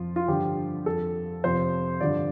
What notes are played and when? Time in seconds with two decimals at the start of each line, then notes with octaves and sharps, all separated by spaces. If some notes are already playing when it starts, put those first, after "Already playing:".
Already playing: F2 F3 F4
0.16 F4
0.28 G2 D3 F3 G4
0.86 F2 F3 A4
1.44 F2 C3 F3 C5
2.00 G2 D3 F3 D5